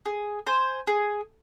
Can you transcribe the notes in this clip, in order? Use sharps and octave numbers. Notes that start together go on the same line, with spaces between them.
G#4
C5 G#5
G#4